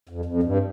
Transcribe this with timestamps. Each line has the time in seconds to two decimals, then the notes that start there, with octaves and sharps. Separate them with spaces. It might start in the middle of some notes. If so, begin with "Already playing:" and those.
0.09 F2
0.25 F2
0.43 G2